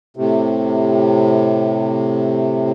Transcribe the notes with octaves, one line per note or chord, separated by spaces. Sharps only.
A2 C3